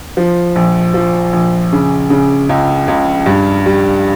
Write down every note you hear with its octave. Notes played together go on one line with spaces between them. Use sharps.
F3
A#1
F3
A#1
C#3
C#3
C#2
C#2
G2
G3